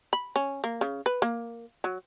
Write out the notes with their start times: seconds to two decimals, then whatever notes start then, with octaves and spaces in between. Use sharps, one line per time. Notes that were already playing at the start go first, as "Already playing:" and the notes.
0.13 B5
0.36 C#4
0.64 A#3
0.81 C#3
1.06 B4
1.22 A#3
1.84 F#3